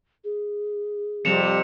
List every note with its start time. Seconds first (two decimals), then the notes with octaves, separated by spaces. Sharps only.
0.24 G#4
1.25 F2 C3 G3 C#7 E7 F7